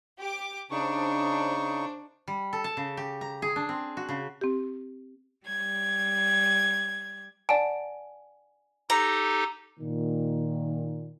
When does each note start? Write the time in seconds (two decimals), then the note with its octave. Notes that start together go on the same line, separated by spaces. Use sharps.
0.20 G4 D6
0.71 C#3 D4 D#4 C5 C#6
2.28 G3
2.53 A4
2.64 A5
2.77 C#3
2.97 G4
3.21 A#5
3.42 G#4
3.56 D4
3.69 C4
3.97 F#4
4.09 C#3
4.41 C4 G4
5.45 G3 G#6
7.49 D5 F#5 G#5 A5
8.90 D#4 G4 A4 A#5
9.79 A#2 D#3